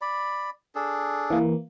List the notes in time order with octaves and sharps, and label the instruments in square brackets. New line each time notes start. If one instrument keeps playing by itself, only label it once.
[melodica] D5 B5
D4 G#4 A4
[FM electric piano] E3 A#3